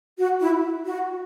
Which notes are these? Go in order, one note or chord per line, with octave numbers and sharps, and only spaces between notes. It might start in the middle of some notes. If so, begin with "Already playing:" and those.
F#4
E4
F#4